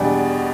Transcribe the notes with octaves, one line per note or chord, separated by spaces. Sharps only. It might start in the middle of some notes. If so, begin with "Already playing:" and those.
Already playing: E2 B2 G3 D4